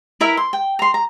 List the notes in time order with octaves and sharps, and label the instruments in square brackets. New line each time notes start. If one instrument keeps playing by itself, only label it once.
[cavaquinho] E4 A#4 E5
C6
G5
A#5 C6
A#5